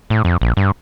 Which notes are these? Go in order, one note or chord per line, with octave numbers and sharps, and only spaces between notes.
A2
F2
A#1
G2